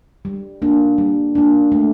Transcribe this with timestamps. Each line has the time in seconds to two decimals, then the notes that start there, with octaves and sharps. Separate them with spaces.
0.25 G3
0.62 A#3 D4
0.98 G3
1.35 A#3 D4
1.72 A3